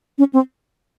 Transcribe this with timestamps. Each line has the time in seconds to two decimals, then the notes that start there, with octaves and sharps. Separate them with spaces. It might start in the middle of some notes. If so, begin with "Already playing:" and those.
0.18 C#4
0.33 C4